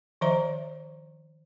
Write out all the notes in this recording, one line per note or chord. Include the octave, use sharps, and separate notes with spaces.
D#3 F3 C5 D#5 E5 A#5